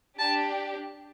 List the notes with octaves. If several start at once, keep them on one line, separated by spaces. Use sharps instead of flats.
D4 G4 A5